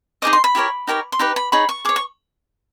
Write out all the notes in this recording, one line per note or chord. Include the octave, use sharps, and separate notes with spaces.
D#4 G#4 C5 D#5 D6
C6
B5
E4 G4 A#4 C#5
D#4 G4 A#4 C#5
C6
D#4 G4 B4 B5
B5
D#4 G#4 C#5 B5
C#6
G#4 C#5 D6
C#6